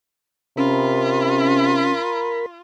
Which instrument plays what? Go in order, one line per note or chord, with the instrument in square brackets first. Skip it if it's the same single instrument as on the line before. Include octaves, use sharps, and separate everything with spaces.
[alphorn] C3 [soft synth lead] C#4 [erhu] F4 [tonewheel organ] A#4 B5